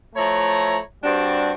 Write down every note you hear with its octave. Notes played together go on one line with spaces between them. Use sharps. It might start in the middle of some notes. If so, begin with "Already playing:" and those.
F3 A3 E4 C#5 A#5
G2 G3 C4 D4 F#4 A5